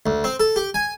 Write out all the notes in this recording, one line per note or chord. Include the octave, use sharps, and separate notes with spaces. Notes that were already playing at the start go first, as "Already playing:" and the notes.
D2
C4
A4
G4
G#5